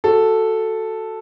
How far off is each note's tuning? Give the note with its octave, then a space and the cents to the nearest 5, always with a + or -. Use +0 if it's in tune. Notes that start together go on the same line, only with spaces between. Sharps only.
F#4 +0 A4 +0